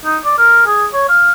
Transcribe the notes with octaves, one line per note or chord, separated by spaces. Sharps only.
D#4
D5
A#4
G#4
C#5
F5